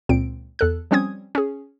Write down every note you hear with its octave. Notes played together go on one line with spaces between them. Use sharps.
C#2 A#2 C4 D7
E2 A4 F#6
F3 G3 C4 C#4 D#6 G#6
C#4 G#4